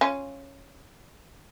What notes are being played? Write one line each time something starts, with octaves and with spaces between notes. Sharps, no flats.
C#4 F4